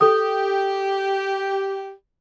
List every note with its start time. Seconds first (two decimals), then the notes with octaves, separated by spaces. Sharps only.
0.01 G4 A4 D#6